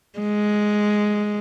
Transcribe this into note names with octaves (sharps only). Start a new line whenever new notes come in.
G#3